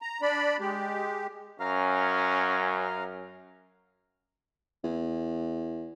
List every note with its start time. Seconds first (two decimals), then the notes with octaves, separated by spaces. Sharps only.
0.02 A#5
0.22 D4 D5 B5
0.59 G#3 G4
1.60 F#2 C#4 F5 A#5
4.84 E2